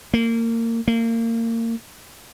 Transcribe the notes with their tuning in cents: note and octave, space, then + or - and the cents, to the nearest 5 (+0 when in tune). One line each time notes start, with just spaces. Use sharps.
A#3 -25
A#3 -30